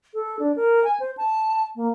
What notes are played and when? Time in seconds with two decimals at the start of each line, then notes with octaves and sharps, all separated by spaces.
0.14 A4
0.39 D4
0.56 A#4
0.84 G#5
1.00 C5
1.17 A5
1.76 A#3